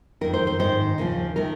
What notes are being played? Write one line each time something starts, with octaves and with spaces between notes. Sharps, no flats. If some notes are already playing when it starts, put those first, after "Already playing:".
F2 D#3 A#4
C5
C5
G#2 D#3 C5
D#2 C#3 F3
C3 D#3 A#4